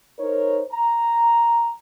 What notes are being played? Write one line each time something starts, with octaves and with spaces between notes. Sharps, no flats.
D#4 A#4 C5 C#5
A#5